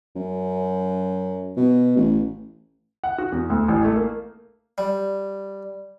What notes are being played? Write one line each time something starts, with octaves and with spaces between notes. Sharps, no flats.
F#2
B2
A1
F#5
F#4
E2
D2
A1
A3
A#3
G3